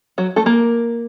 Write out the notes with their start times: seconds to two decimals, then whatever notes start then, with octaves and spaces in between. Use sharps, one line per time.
0.18 F#3 F#4
0.36 A3 A4
0.46 A#3 A#4